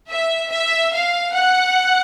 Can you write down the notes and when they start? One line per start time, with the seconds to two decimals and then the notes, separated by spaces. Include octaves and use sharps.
0.10 E5
0.51 E5
0.94 F5
1.35 F#5